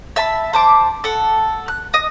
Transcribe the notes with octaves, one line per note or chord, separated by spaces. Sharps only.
E5 A5 B5
C5 A5 D6
A4 F#5
F#6
D#5